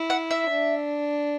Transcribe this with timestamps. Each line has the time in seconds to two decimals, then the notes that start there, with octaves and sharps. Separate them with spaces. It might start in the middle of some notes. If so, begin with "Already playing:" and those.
Already playing: E4
0.10 F#5
0.31 E5
0.51 D4